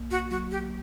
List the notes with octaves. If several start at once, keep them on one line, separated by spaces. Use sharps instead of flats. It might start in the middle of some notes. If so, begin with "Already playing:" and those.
Already playing: B1 A#3
F#4
F#3 F#4
G4